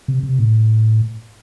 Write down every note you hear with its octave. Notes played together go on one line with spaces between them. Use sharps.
C3
C3
A2